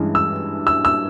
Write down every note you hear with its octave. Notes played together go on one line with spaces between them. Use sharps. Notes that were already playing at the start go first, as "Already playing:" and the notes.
Already playing: G2 E3 G#3 C#4
E6
E6
E6